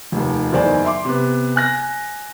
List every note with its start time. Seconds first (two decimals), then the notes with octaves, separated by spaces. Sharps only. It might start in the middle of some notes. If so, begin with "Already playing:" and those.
0.12 F1 D#2
0.52 F#1 E2 D#3 C5 D5 G#5
0.84 E5 C6 D6
1.05 C3 B3
1.56 G#5 F#6 A#6